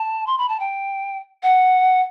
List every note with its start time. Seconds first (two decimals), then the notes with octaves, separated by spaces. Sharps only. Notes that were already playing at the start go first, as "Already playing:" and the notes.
Already playing: A5
0.27 C6
0.38 B5
0.49 A5
0.60 G5
1.43 F#5